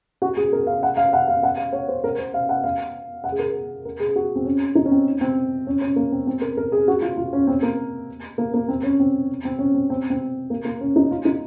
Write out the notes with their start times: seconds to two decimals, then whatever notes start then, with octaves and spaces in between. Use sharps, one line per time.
0.22 F#4
0.37 G#4
0.52 A#4
0.67 F5
0.83 F#5
0.97 F5
1.13 F#5
1.28 F5
1.43 F#5
1.57 F5
1.73 C#5
1.88 C5
2.04 A#4
2.19 C5
2.34 F5
2.49 F#5
2.64 F5
3.24 F#5
3.32 G#4
3.39 A#4
3.85 A#4
4.00 G#4
4.16 F#4
4.35 C4
4.45 C#4
4.75 D#4
4.85 C#4
4.91 C4
5.21 C4
5.67 C#4
5.81 C#4
5.96 A#3
6.12 C4
6.27 C4
6.41 A#4
6.57 A#4
6.72 G#4
6.88 F#4
7.02 F4
7.17 F4
7.33 C#4
7.47 C4
7.63 A#3
8.38 A#3
8.54 A#3
8.68 C4
8.83 C#4
8.99 C4
9.45 C4
9.59 C#4
9.74 C4
9.90 C4
10.10 C4
10.50 A#3
10.65 A#3
10.81 C#4
10.96 D#4
11.11 F4
11.25 D#4